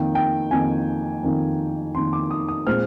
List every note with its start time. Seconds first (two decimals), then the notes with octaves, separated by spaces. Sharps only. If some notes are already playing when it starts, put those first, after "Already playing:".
Already playing: F2 D#3 A#3 G5
0.15 G5
0.51 F2 D#3 A#3 G#5
1.23 F2 D#3 A#3
1.94 F2 D#3 A#3 C6
2.13 D6
2.31 D#6
2.48 D#6
2.67 A#2 G#3 C4 F6